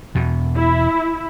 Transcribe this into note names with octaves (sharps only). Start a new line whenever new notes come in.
E2 B2
E4